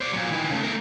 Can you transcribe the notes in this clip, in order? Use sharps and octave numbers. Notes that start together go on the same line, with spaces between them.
C5 D5
A#2 F#3
D#3 E3
C#3 A3
A3 A#4